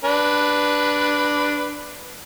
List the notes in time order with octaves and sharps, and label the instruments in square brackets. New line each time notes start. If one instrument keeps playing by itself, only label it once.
[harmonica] D4 B4